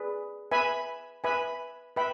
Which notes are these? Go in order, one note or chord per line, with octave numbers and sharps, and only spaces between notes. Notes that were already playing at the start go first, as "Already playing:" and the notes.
Already playing: G#4 B4 D5
B4 E5 G#5 B5
B4 E5 G#5 B5
B4 E5 G5 B5